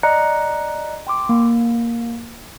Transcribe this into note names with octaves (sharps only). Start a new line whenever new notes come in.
D5 D#5 A#5 F#6 C#7
G5 C6 D6
A#3